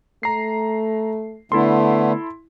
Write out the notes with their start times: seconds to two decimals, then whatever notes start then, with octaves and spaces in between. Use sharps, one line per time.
0.23 A3 A#5 C7
1.52 D3 A3 B3 D4 E4 A4 C6